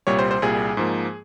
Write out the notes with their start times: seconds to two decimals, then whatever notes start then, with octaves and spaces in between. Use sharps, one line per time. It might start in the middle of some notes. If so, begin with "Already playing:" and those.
0.07 C2 A#2 G3 C#5
0.19 C5
0.31 C5
0.42 C2 A#2 G3 G#4
0.77 G#2 F3 A#3